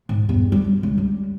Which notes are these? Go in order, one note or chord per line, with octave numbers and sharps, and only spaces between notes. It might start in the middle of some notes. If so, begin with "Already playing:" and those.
G#2
E2 G2
G3
G3
C#2
G3